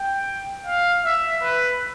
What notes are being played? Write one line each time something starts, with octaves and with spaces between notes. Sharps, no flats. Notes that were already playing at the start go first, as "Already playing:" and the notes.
Already playing: G5
F5
E5
B4